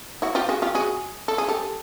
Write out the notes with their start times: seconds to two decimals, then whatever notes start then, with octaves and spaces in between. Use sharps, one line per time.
0.22 E4 F#4
0.35 F4 G4
0.49 F#4 G#4
0.62 F4 G4
0.75 F#4 G#4
1.28 A4
1.38 G#4
1.48 G4 A4